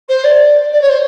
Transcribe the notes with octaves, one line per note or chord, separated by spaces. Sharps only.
C5
D5
D5
C#5
C5